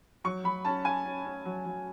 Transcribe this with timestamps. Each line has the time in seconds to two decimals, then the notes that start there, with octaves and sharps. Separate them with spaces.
0.24 F#3 C#6
0.44 F#3 B5
0.65 C#4 A5
0.85 C#4 G#5
1.05 C#4
1.25 C#4
1.45 F#3
1.65 F#3